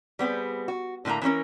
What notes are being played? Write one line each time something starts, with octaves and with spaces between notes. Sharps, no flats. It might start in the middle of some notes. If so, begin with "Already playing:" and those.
G3 B3 C4 G#4
F#4
A2 D3 A3 A#3 A#5
E3 A#3 B3 C#4 A#4